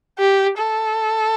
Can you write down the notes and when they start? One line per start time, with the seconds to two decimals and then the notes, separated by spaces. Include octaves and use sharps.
0.19 G4
0.58 A4